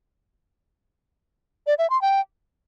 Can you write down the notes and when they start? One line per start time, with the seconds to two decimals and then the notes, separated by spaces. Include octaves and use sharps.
1.67 D5
1.78 E5
1.90 C6
2.01 G5